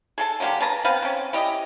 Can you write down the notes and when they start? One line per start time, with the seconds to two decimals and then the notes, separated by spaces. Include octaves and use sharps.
0.18 G#4 A4 A5
0.40 D3 F#3 A#3 G4
0.61 G#4 B4 A5 A#5
0.85 B3 C4 B4 F5
1.03 C4 C#4
1.33 E4 G4 D#5